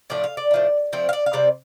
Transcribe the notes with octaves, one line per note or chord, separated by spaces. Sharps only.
A2 F3 A3 D4 D5
F5
D5
A2 F3 D4
F3 A3 C4 D5
F5
D5
F5
C3 G3 C4 D5